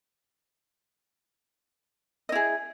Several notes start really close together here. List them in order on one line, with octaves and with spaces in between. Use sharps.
D#5 E4 G#4